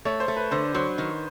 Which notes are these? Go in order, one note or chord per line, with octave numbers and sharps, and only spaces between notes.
A3 C#5
C5
A3
B4
D3 C5
F#3 C5
D#3